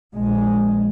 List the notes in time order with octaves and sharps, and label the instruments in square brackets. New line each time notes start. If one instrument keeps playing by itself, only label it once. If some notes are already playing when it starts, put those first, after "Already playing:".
[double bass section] A#1 G#3